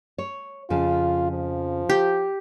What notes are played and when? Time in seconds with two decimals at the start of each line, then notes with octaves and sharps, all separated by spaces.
0.18 C#5
0.70 F2 C#3 F4
1.31 F3
1.89 G4